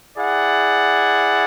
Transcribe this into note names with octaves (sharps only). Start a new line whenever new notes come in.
E4 G#4 D5 F#5